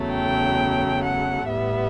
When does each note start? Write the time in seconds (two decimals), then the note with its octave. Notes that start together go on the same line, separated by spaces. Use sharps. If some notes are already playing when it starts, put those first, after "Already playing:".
Already playing: E2 C#3 F#3 A3
0.09 G5
1.02 F#5
1.49 A2 G3 B3 E5